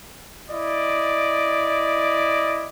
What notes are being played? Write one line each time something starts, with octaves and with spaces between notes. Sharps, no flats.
E4 D5 D#5